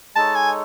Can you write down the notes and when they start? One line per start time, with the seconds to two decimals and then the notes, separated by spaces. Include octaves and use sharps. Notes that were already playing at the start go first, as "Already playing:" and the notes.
0.16 G#3 D#4 A4 C#5 A5
0.35 G#5